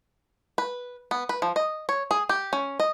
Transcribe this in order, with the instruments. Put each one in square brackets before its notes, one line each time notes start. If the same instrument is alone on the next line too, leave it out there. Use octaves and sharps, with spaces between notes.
[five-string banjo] B4
B3
B4
F3
D#5
C#5
G#4
G4
C#4
D#5